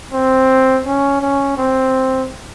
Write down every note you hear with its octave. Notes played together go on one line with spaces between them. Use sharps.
C4
C#4
C#4
C4